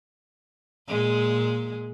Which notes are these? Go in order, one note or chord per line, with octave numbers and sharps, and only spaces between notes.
A#2 G#3